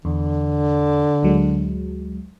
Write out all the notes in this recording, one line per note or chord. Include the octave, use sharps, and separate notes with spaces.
E2 D3
D2 F#3 G#3